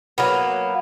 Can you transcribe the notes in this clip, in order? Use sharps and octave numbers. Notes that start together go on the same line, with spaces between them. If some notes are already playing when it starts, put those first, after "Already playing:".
F#3 A#3 B3